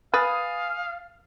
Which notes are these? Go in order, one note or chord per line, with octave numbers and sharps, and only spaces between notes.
B4 F5 G#5 D#6 A6